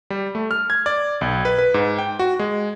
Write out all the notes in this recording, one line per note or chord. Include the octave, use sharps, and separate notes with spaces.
G3
A3
F6
G#6
D5
B1
B4
B4
G#2
G5
F#4
G#3